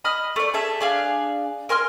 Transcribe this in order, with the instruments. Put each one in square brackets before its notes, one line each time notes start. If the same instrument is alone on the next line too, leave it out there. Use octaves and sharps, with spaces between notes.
[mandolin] D#5 B5 D#6 F6
A3 D5
G#4 A4 E5
D4 G#4 F5
A#4 G#5 C6 F6